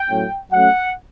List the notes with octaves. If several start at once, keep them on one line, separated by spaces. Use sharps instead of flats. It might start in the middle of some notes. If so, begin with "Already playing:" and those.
Already playing: G5
A2 F#3 C#4
F#3 A3 C#4 F#5